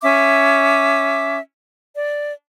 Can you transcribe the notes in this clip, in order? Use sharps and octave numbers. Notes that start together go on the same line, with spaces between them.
C#4 E5 D6
D5